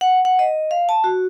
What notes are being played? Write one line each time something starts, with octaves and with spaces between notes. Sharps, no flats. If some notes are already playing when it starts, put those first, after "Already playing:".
F#5
F#5
D#5
F5
A5
F#4